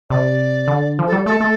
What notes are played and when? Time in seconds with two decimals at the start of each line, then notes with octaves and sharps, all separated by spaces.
0.10 C3 D5
0.68 D3
0.99 F3
1.07 A4
1.12 G3
1.26 A3 A4
1.40 A3